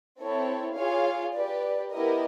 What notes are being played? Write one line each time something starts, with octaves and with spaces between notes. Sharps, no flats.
C4 E4 A4 C#5
F4 G#4 C#5 F5
G4 B4 D5
B3 E4 G4 A#4 D#5